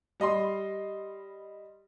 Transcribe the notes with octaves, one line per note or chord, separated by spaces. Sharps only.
G3 D#5 B5 C6